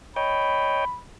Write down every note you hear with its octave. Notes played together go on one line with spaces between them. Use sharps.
C#5 D#5 G5 B5